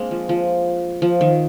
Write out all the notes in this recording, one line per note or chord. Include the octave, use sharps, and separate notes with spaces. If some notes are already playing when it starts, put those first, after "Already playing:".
Already playing: G#3 A#3 C4 D4
F3
F3
F3
D#3